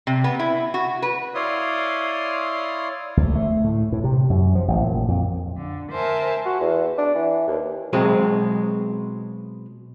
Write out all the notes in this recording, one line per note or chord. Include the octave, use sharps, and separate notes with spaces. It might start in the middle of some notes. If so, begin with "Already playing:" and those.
C3
B3
E4
F#4
B4
E4 C#5 D5 F5 C6 D#6
D2
A3
A2
A2
C3
F#2
F3
A1
A#2
F2
D3
A#4 C5 E5 G#5 A5
F#4
E2
D4
E3
D#2
B2 F#3 G#3 C4